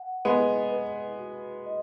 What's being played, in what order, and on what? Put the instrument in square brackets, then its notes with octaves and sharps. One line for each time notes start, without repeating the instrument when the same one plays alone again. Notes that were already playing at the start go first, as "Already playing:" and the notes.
Already playing: [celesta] F#5
[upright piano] G#3 B3 [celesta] D#5
[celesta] B4
F#4
D#5